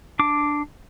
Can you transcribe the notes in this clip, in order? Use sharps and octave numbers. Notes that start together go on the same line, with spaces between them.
D4 D6